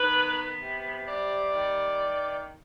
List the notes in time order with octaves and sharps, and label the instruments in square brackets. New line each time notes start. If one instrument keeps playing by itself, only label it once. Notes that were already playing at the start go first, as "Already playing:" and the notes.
Already playing: [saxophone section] D#3 B4
B3
C3
G3 D5
D#3